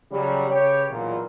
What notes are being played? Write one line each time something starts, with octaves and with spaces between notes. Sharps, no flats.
C#3 F#3 G3
C#3 G4 B4 C#5
B1 E2 A#2